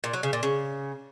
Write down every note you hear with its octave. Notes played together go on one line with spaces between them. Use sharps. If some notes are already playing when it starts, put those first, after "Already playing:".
A#2
F#3
C#3
A#2
C#3